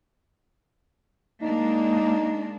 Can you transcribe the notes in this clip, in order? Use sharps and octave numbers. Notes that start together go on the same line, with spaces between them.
G#3 A#3 D4 D#4